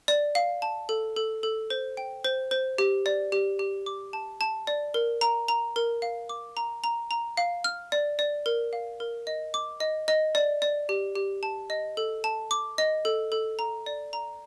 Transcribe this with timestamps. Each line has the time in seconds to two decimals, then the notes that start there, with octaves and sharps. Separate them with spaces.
0.08 D5
0.35 F5
0.62 A5
0.89 A4
1.16 A4
1.43 A4
1.70 C5
1.97 G5
2.24 C5
2.51 C5
2.78 G4
3.06 D5
3.32 G4
3.59 G4
3.86 D6
4.13 A5
4.41 A5
4.67 D5
4.94 A#4
5.21 A#5
5.48 A#5
5.76 A#4
6.02 F5
6.29 D6
6.57 A#5
6.84 A#5
7.11 A#5
7.37 F5
7.64 F6
7.92 D5
8.19 D5
8.46 A#4
8.73 F5
9.00 A#4
9.27 D#5
9.54 D6
9.80 D#5
10.08 D#5
10.35 D5
10.62 D5
10.89 G4
11.15 G4
11.43 A5
11.70 D#5
11.97 A4
12.24 A5
12.51 D6
12.78 D#5
13.05 A4
13.32 A4
13.59 A#5
13.86 D5
14.13 A#5